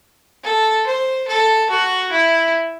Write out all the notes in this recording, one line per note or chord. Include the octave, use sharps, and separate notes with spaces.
A4
C5
A4
F#4
E4